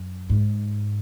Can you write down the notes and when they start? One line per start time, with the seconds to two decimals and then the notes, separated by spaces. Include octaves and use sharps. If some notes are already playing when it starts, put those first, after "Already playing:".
Already playing: F#2
0.30 G#2